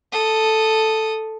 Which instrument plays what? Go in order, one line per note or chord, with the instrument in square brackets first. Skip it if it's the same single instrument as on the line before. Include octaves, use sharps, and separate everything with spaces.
[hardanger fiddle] A4 D#6